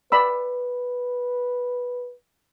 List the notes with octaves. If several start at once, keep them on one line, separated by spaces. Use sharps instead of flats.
B4 D5 B5 E6